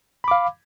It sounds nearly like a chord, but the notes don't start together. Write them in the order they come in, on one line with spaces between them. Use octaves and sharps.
B5 D6 F5